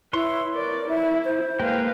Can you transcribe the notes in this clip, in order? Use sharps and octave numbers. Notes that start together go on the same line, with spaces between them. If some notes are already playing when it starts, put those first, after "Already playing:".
E4 B4 C#5 C6
A#4 D5
E4 E5
C5
G#3 A#3 B4 F5 G5